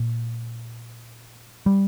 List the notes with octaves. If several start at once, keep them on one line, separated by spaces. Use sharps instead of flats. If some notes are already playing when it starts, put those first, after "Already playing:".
Already playing: A#2
G3